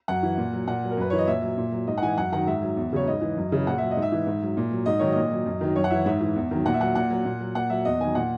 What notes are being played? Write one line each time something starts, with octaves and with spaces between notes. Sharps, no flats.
F#2 F#5
E3
A#2
F#3
A#2 F#5
F#3
A#4
F#2 B4
E3 C#5
D#5
A#2 E5
F#3
A#2
F#3
G#2 D#5
F#5
E3 G#5
F#2 F#5
D#3 F#3 F#5
G#2 E5
F#3
E2
C#3 F#3 C#5
G#2 D#5
E3
F#2
C#3 E3
A#2 F#5
F#3 E5
D#5
G#2
E5
E3
G#2
F#3
A#2
F#3
G#2 D#5
D#3 F#3 C#5
A#2 D#5
F#3
F#2
D#3 F#3
F#2 C#5
F#5
E3 E5
G#2 E5
E3
E2
D#3 F#3
A#2 F#5
E5
F#3 F#5
A#2 F#5
F#3
A#2
F#3
A#2 F#5
F#3 E5
E2 D#5
D#3 F#3 G#5
A#2 F#5